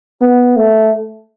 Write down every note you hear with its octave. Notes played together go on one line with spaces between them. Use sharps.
B3
A3